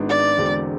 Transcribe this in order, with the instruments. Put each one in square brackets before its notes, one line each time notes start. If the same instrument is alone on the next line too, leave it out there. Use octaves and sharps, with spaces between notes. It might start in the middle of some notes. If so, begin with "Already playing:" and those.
Already playing: [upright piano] G#1 G#2 G#3 B3 D4
[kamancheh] D5
[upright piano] E1 E2 D3 G#3 C4